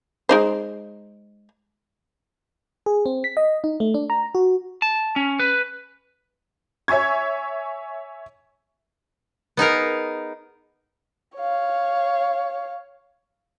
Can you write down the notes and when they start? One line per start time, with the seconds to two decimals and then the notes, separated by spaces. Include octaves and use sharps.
0.29 G#3 D#4 C5
2.86 G#4
3.06 C4
3.24 B6
3.37 D#5
3.64 D#4
3.80 A3
3.94 D4
4.10 A#5
4.35 F#4
4.82 A5
5.16 C#4
5.39 B4
6.88 C#5 E5 G#5 C#6 G#6
9.57 B3 D#4 G#4 A#4
11.36 C#5 F5